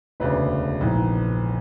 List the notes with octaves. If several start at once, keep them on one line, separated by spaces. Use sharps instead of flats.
E1 D2 C#3 B4
A#1 G#2 E3